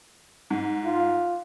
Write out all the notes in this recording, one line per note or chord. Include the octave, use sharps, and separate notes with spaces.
G#2
F4